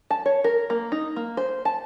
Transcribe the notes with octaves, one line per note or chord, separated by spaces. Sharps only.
A5
C#5
A#4
A#3
D#4
A#3
C5
A5